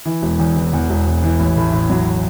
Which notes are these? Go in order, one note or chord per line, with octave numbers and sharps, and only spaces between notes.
E3
E1
E2
E3
E2
E1
E1
E3
A1
A2
A2
F#3